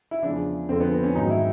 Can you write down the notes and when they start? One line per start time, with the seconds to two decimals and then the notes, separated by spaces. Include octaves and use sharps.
0.11 E4
0.23 E2 C#3 F3 D4
0.69 F2 D3 F3 C4
0.80 B3
0.92 C4
1.03 C#4
1.15 G#2 D#3 F#3 D#4
1.30 E4